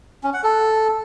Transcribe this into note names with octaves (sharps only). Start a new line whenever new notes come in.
C#4
F#5
A4